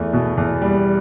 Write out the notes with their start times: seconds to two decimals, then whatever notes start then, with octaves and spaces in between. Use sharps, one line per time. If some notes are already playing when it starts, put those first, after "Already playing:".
Already playing: E2 A3
0.13 B2
0.37 E2
0.62 G3